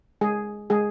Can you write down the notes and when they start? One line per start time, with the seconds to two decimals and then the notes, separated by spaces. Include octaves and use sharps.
0.21 G#3 G#4
0.70 G#3 G#4